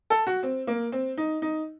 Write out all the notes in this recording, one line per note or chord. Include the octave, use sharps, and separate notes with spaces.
A4
F#4
C4
A#3
C4
D#4
D#4